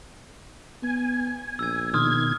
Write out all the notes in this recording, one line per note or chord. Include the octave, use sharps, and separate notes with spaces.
B3 G#5
A#1 E6 G#6
B2 D#3 C6 D#6 F6 G#6